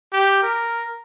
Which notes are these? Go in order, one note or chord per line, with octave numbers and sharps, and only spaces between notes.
G4
A#4